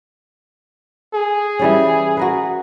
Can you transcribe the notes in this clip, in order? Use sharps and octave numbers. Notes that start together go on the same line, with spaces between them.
G#4
E3 G3 C#4
F#4 A#4 B4